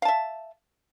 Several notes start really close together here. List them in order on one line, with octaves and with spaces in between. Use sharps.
F5 A5 E5